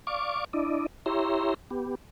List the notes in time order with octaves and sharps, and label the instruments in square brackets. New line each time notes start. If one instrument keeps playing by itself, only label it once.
[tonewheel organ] D5 F5 C#6 D6
D4 E4 D5 D#5
E4 G4 C#5 E5 A#5 C6
B3 G4